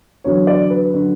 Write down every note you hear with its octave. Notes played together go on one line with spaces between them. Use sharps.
E2 D3 F#3 C#5
D5
B4
D3 F#3